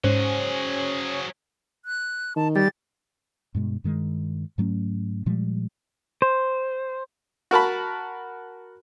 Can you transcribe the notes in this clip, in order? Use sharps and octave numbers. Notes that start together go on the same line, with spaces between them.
G#2 F#3 C#4 G#4 C5
F#6
D#3 A5
G3 A6
G2 B2 G#3
G2 D#3 G#3
G#2 F#3 A3 C#4
A#2 F3 G3 G#3
C5
F#4 A#4 A5 B5